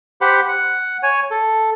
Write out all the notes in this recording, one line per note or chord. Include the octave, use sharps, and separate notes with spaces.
G4 C5 F#5 B5
F#5
C#5 G#5
A4